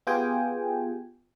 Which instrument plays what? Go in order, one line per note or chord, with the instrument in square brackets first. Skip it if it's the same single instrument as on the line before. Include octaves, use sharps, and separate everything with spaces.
[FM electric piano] B3 F4 G4 G#4 G5 G#5